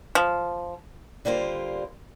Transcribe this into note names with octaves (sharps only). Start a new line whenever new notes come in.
F3
D3 G3 A#3 F4 C5